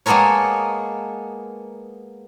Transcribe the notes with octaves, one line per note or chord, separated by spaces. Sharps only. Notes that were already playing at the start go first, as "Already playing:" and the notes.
G#3 A#3 B3 A4 A#4 C#5